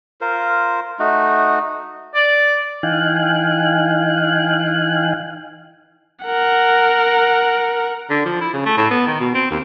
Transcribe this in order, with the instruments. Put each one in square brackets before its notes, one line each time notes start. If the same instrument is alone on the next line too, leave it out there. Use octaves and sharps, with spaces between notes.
[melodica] F4 A#4 C5
A3 D#4 F#4
[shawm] D5
[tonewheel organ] E3 D#4 F5 G5 G#5 F#6
[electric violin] A#4 F#5
[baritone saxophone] D3
F3
E4
C#3
A3
A2
B3
D#3
B2
C4
D#2